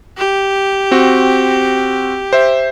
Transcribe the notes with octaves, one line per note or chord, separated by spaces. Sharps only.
G4
C4 F#4
C5 E5